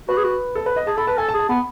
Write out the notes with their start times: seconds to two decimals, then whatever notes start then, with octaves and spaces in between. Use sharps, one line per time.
0.09 F#4 B4
0.18 G#4
0.24 F#4
0.55 A4
0.66 B4
0.76 D#5
0.87 G#4 A5
0.97 A4 B5
1.07 B4 A5
1.18 A4 G#5
1.29 A5
1.34 G#4
1.39 A5
1.49 B3 B5